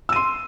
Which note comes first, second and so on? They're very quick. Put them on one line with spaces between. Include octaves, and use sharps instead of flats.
E6 D#7 C6